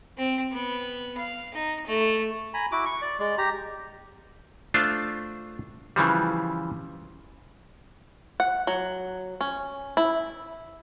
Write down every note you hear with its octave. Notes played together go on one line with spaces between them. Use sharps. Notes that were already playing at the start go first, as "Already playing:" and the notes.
C4
B3
F5
D#4
A3
G#5 A#5 B5
E4 F#4 D6
C#6
D5
G#3 D5
G4 A#5
A3 D4 F4 C5
C#3 E3 F3 G3
F#5
F#3
C#4
E4